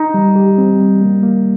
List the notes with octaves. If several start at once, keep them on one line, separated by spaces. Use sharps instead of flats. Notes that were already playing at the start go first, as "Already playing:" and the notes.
Already playing: D#4
G3
G4
C4
G3
A#3
A#3